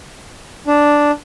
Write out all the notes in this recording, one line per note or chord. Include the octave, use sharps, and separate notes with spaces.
D4